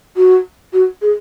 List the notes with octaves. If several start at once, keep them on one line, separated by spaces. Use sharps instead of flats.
F#4
F#4
G#4